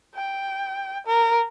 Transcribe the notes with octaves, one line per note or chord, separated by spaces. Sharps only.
G5
A#4